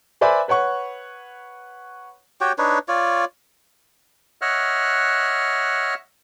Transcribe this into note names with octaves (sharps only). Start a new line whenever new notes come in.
B4 C5 D5 E5 G#5 B5
B4 C#5 F#5 C#6
F#4 G4 C#5 G5
D4 D#4 B4 C#5
F4 C#5 D5
C#5 D#5 E5 F#5 F6 F#6